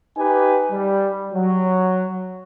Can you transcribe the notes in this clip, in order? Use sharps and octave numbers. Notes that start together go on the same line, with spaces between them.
D#4 G4 B4 G#5
G3
F#3